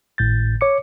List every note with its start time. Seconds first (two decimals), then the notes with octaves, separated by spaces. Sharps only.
0.18 G#1 A2 G6 A6
0.61 C#5 D6 C#7